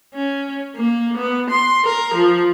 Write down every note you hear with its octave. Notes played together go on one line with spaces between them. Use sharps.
C#4
A#3
B3
C6
A#4
F3